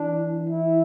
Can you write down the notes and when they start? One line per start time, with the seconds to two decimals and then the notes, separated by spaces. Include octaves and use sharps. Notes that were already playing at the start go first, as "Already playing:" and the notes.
Already playing: E3 D4
0.50 E4